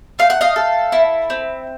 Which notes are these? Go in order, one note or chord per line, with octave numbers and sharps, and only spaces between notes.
A3 F5
F#5
D#5 F5
A4
E4
C4